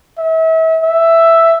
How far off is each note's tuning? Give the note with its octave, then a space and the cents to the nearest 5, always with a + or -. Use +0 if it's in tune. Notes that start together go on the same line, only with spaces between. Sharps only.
E5 -35
E5 +5